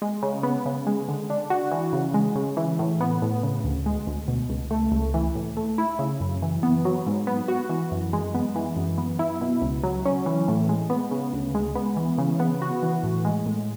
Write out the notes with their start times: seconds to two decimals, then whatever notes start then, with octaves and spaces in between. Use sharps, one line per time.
0.02 G#3
0.23 C#3
0.43 B3
0.66 C#3
0.87 G#3
1.09 D3
1.30 D4
1.50 F#4
1.71 E3
1.93 C#3
2.14 G#3
2.35 C#3
2.57 E3
2.79 A2
3.01 B3
3.22 A2
3.43 C#3
3.64 D2
3.86 G#3
4.07 D2
4.28 B2
4.49 C#2
4.71 A3
4.92 C#2
5.14 E3
5.35 A2
5.57 A3
5.78 E4
5.99 C#3
6.20 F#2
6.42 E3
6.63 B3
6.85 F#3
7.07 G#2
7.27 B3
7.48 F#4
7.69 E3
7.92 F#2
8.13 G#3
8.34 B3
8.56 E3
8.76 F#2
8.98 B3
9.19 E4
9.41 B2
9.62 C#2
9.83 F#3
10.06 C#4
10.26 E3
10.48 A2
10.69 G#3
10.90 B3
11.11 C#3
11.33 D2
11.55 G#3
11.75 B3
11.97 E3
12.18 C#3
12.40 B3
12.62 F#4
12.83 E3
13.03 A2
13.25 G#3
13.46 A2